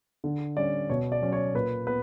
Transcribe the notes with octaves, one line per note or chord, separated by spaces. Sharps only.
D3
G3 C#4 D5
B2 C#5
D5
F#3 C#4
C#5
A#2 B4
B3 B4